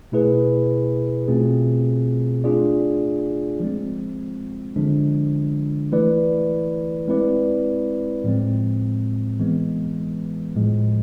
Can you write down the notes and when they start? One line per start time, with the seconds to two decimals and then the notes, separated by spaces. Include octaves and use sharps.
0.12 B2 A3 E4 G#4 B4
1.28 B2 A3 C4 F4 G#4
2.44 A3 D4 F4 G#4 D5
3.60 F3 G#3 C4
4.76 D3 F3 G#3 D4
5.92 E3 A3 E4 B4 D5
7.08 G#3 C4 E4 B4 D5
8.24 A2 F3 G#3 C4
9.40 E3 G#3 B3
10.56 A2 F3 G#3